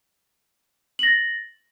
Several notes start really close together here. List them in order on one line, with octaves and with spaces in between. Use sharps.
F#7 A#6 A6